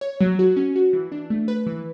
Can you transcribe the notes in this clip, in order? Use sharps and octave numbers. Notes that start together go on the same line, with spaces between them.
C#5
F#3
F#4
C#4
F#4
E3
D4
A3
B4
E3